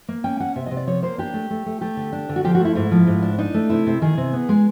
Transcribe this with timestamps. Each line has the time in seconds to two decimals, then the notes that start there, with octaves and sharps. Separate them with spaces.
0.08 A#3
0.24 C#4 G5
0.40 A#3 F#5
0.56 C3 E5
0.66 C3 D#5
0.77 D5
0.87 F3 C#5
1.02 A#3 C5
1.18 D4 G4
1.34 A3
1.50 A3
1.66 A3
1.81 A3 G4
1.97 D3
2.13 D4
2.29 D3
2.36 F#4
2.44 F3 G4
2.55 F#4
2.60 A3
2.65 E4
2.75 G#2 E4
2.91 F3
3.07 G#2
3.22 D4
3.38 D4 D#4
3.54 A3
3.70 C3 E4
3.86 C3
4.02 D#3 G#4
4.17 C3
4.33 B3
4.49 G#3